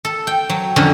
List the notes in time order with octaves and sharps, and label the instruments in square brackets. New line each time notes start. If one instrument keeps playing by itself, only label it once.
[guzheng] A4
G5
F#3
F2 D3 F#3 C#4 A#5